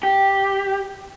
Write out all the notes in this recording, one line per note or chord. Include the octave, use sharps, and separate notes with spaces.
G4